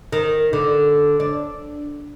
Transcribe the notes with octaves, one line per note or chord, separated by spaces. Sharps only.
D#3
D3
D4